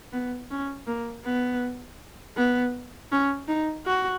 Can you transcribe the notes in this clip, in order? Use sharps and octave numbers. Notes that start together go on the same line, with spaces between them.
B3
C#4
A#3
B3
B3
C#4
D#4
F#4